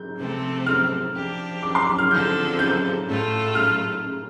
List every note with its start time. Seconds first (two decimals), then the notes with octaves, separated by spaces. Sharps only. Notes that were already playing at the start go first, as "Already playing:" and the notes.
Already playing: G6
0.18 C3 F3 A3 C4 A4
0.66 F6
1.15 F3 D4 G4
1.63 D6
1.75 C6
1.87 D6
1.98 F6
2.10 D3 F3 C4 A4 G6
2.59 G6
3.07 A2 A3 F4 A4
3.55 F6